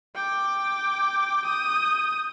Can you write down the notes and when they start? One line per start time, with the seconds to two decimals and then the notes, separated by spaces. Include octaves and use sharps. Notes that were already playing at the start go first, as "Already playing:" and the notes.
0.15 G5 D6
1.46 D#6 G6